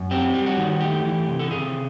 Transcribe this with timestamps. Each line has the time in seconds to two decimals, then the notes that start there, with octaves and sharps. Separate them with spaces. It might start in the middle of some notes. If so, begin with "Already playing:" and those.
Already playing: F#2
0.11 C4 G4
0.34 G3
0.46 F#4
0.57 D#3
0.80 A3 G4
1.05 E3
1.28 C3
1.39 A4
1.51 C3 G#4